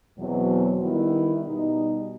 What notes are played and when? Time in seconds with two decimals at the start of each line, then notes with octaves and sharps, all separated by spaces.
0.17 E2 B2 F#3 C4
0.81 D#3 G3 B3 E4
1.46 B2 G3 D#4